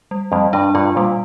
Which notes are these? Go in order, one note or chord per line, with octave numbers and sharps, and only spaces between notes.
G3
F2 G3
G2 D4
G2 F4
A#2 G3